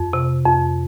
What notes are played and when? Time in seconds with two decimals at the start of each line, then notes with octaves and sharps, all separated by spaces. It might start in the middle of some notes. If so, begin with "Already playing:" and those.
Already playing: F2
0.13 C3
0.45 F2